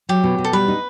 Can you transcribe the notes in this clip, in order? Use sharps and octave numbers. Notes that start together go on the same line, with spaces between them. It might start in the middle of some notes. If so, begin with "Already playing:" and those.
F#3 G4
B2
B2
A4
G3 B4
D#4